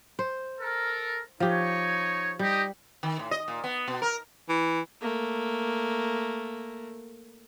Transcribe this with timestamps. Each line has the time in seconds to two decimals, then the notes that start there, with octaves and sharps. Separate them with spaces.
0.19 C5
0.60 A4 A#4
1.40 F3 D#4 G4 C#5
2.39 G3 D#4 G4 D#5
3.03 D#3
3.19 A2
3.31 D#5
3.48 A#2
3.64 B3
3.88 B2
4.02 A#4
4.49 E3
5.01 A3 A#3